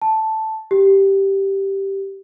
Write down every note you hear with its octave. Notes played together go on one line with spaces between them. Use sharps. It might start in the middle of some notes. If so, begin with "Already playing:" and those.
A5
G4